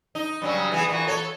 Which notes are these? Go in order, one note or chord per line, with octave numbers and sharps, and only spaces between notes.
D#4
G2 C#3 F#3
E3 B3 G#4
A#2 E3 F#4
A4 C#5